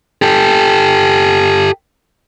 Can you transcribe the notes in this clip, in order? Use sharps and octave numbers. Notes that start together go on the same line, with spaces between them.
G4 A4